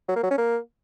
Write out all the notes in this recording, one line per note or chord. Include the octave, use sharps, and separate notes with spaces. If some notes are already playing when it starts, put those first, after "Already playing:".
F#3
A#3
F#3
C#4
A#3